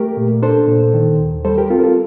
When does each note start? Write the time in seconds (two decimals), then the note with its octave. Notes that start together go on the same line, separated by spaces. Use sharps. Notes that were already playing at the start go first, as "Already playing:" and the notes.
Already playing: A3 G4 A#4
0.17 A#2
0.42 D4 A4 C5
0.68 A#2
0.94 D#3
1.20 D#2
1.45 G3 A4 C5
1.58 G4 A#4
1.70 C4 F4 A4
1.78 A#4
1.83 F4 A4